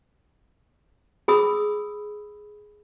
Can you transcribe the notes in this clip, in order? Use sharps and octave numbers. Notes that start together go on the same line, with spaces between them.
G#4 B5 D#6 E6